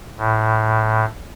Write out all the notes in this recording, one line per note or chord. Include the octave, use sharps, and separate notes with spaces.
A2